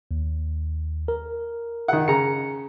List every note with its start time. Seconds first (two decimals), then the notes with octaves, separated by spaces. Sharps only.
0.11 D#2
1.08 A#4
1.88 D#3 F#5
2.08 C#3 A#5 C#7